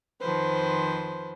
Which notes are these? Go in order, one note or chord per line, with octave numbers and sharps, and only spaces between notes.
F2 D#3 F3 B4 C5